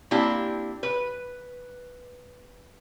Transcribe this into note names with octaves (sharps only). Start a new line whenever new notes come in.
A#3 C4 D4 E4 G4
B4